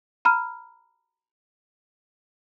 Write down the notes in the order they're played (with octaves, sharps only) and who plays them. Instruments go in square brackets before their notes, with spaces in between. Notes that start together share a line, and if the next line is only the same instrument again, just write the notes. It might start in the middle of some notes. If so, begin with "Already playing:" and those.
[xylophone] A#5 B5 F6